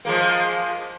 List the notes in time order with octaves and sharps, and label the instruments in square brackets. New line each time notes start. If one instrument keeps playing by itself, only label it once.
[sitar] F3 G#3 A#3